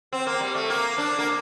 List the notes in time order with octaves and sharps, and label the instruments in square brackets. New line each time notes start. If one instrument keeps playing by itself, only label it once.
[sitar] C4
A#3
G3
A3
A#3
D4
A#3